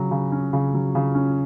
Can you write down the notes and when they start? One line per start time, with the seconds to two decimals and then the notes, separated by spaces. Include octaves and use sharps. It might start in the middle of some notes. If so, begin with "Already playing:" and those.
Already playing: C#3 F#3
0.11 C#3
0.32 C#4
0.53 C#3
0.74 F#3
0.95 C#3
1.15 C#4